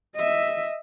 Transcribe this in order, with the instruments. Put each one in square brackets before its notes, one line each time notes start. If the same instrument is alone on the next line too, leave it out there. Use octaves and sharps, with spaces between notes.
[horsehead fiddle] D#5 E5